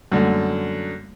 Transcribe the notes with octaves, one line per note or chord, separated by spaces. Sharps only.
F#2 D3 G3 A3 A#3